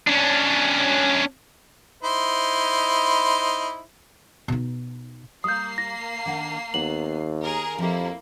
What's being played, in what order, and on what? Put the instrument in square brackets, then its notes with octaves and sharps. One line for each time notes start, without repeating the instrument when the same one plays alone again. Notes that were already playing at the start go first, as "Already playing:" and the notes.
[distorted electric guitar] C#4 D4
[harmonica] D#4 E4 C5
[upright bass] B2 D#4
[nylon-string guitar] G3 [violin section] A#3 C7 [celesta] D#6 G6
[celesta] A#6
[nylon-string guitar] D#3 D4 F#5
[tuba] D#2 [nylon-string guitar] B3 [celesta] F#7
[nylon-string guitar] D#3 [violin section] G#4 A#4 A#5
[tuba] F2 [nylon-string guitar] F3 G4 [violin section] A#3 E4